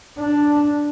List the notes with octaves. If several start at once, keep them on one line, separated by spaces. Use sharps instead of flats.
D4